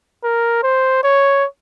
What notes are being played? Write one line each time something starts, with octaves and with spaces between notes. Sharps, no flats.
A#4
C5
C#5